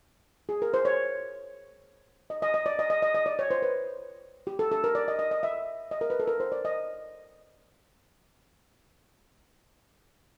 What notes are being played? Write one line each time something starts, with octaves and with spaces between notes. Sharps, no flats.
G#4
A#4
C5
C#5
D#5
D#5
D#5
D5
D#5
D#5
D#5
D#5
D5
C#5
C5
B4
G4
A4
A4
A#4
D5
D#5
D#5
D#5
E5
D#5
A#4
B4
A4
A#4
C5
D5
D#5